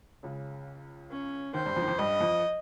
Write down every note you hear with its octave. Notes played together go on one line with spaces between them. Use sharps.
C#2 C#3
C#4
D#2 D#3 C5
G2 G3
F2 F3
D#3
F2 F3
G2 G3 D#5
F2 F3